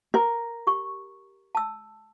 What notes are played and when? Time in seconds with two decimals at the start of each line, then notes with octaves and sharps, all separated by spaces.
0.14 A#4
0.67 G4 C#6
1.55 A5 E6